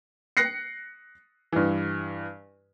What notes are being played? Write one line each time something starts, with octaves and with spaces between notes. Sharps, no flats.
F#6 A#6 C7 C#7
G2 E3